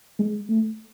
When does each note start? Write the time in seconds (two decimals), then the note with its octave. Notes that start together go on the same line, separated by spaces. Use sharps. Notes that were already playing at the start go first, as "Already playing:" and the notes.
0.19 G#3
0.49 A3